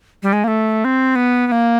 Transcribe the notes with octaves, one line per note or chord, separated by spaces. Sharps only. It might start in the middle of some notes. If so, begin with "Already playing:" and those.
G3
G#3
A#3
A3
C4
B3
B3
A#3